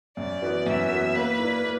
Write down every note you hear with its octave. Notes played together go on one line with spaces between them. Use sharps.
F#2 D5
E3 B3 F#4
F#2 E5
E3 B3 F#4
A#3 B4
E4 A#4 D5
A#3